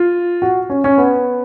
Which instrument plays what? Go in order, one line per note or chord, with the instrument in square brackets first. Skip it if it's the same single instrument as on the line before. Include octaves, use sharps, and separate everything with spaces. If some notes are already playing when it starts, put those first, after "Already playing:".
Already playing: [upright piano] F4
F#4
C#4
C#4
B3